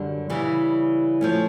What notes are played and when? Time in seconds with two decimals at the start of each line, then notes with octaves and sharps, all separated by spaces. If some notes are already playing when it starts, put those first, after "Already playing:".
Already playing: F#2 D3 G3
0.30 C#3 E3 G3
1.21 F3 A3 C#4